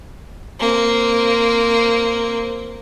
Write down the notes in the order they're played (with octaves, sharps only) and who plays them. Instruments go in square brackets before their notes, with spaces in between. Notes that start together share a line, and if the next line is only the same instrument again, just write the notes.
[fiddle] A#3 C4